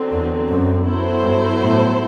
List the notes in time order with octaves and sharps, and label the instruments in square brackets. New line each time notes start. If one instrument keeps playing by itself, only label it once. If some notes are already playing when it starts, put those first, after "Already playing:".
Already playing: [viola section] D3 F#3 C4
[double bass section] E2
F#2
[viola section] F#3 B3 E4 A4 C5
[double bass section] G2
A2